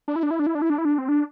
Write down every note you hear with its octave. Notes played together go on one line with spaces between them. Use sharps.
D4
E4
D4
E4
D4
E4
D4
E4
D4
E4
D4
C4
D4